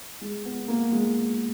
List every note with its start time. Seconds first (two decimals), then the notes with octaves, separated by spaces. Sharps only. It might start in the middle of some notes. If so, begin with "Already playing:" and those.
0.21 G#3
0.45 B3
0.68 A#3
0.92 G#3